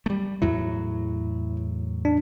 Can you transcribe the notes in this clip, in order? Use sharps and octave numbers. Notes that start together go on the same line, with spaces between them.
G3 A3
E2 A2 F#3 E4
D4